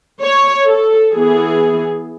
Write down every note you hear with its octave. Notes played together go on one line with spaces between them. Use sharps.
C#5
A4
E3 B3 G#4